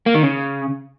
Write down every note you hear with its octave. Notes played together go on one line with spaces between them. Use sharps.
A#3
D#3
C#3